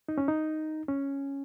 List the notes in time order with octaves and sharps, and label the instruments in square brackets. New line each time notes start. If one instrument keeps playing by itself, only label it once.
[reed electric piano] D#4
C#4
D#4
C#4